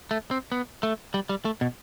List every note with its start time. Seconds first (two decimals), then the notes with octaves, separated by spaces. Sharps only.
0.11 A3
0.31 C4
0.52 B3
0.83 A3
1.14 G3
1.29 G3
1.45 A3
1.61 B2